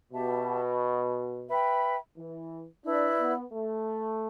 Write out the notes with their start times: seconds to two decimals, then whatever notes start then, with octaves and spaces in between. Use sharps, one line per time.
0.12 B2 G4 E5 A5
1.48 B4 E5 G5 B5
2.17 E3
2.84 D4 E4 B4 D5
3.19 B3
3.53 A3